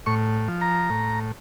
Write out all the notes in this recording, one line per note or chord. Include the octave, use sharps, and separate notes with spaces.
A2 C#6
F3
A#5
A2